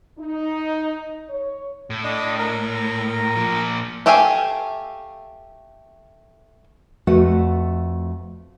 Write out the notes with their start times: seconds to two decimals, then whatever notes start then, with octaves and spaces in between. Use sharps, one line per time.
0.18 D#4
1.28 C#5
1.90 A2
2.04 D4 D#5
2.38 A#4
3.36 A#2 F3
4.06 A3 G4 E5 F5 G#5
7.07 F2 A3 F#4 B4 F#5